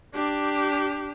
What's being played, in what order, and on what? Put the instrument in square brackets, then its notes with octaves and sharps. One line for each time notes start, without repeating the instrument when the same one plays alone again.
[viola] D4 G4